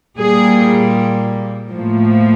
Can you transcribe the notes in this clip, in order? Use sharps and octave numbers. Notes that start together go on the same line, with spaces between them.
A#2 G3 A#3 G#4
A2 F3 A#3